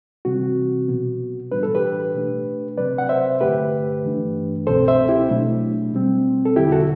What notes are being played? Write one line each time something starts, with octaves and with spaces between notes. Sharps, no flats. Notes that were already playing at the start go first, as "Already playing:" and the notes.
C3 E3 G3 C4 F#4
B2 F#3 B3
A2 E3 G3 D4 B4
A4
G4 B4
B2 A3 D4
C3 F#3 C4 B4 D5
F#5
C5 E5
G2 D3 A3 G4 B4
G2 E3 A3 D4
C2 B2 F#3 C4 A4 C5
C5 E5
E4 G4
B2 F#3 A3 D4
B2 G3 C4
A4
E2 D3 F#3 E4 G4
F#4 A4